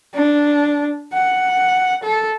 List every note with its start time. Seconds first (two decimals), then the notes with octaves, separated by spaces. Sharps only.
0.15 D4
1.13 F#5
2.03 A4